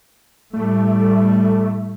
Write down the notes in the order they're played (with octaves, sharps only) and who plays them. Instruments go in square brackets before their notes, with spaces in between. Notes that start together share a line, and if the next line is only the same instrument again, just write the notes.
[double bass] A2 G3 [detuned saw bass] A3